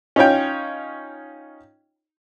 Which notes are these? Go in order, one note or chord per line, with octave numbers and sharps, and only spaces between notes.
C#4 D#4 F4 C#5 G5